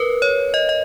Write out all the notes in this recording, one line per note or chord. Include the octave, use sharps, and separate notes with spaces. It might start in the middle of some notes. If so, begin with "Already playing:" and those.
Already playing: A#4 B4
C#5
D#5
D#5